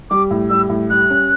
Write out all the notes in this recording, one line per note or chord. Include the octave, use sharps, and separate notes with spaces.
G3 D6
A2
G3 E6
A2
G3 F#6
C#4